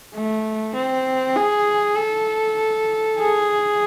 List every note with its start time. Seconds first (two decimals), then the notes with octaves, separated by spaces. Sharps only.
0.14 A3
0.74 C4
1.36 G#4
1.97 A4
3.19 G#4